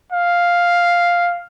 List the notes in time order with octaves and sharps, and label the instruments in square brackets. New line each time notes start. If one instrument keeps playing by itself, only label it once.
[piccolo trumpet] F5